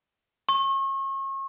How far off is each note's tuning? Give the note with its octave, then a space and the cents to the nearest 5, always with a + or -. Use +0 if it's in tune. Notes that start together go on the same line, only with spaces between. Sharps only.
C#6 -35